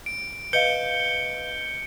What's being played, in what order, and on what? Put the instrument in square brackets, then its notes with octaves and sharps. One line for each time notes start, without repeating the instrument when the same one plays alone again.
[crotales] D7
[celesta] B4 D#5 F5 [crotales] G6 C#7 G7